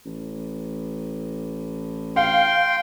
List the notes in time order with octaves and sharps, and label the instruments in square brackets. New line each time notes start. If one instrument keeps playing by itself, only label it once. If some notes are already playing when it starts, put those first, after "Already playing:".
[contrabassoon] A1
[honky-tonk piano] F5 [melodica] G5 C6